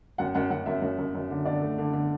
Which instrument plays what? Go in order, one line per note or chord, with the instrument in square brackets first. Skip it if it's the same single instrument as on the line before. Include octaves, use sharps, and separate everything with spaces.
[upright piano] F#2 F#5
F#2 F#5
F#2 F#5
F#2 E5
F#2
F#2
F#2
D3
D3 D5
A3
D3
D3